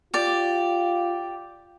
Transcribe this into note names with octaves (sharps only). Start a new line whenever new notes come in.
F4 G4 D5